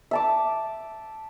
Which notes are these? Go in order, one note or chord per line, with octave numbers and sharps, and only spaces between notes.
E5 A5 D6